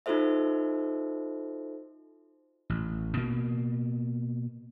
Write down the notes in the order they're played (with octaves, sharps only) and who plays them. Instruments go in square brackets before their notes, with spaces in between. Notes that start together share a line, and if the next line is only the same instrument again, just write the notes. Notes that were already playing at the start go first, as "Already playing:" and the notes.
[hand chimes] D#4 F4 F#4 A4 C5 E5
[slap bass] A1
B2 A#3